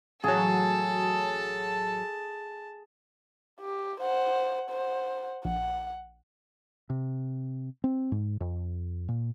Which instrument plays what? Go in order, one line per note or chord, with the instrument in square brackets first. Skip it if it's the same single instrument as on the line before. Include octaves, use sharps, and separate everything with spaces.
[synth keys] A1 F#3 [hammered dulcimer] G#4 [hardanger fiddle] A4 [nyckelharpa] A5
[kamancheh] G4
C5 F#5
C5 F#5
[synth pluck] A#1 [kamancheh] F#5
[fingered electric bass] C3
C4
G#2
F2
A#2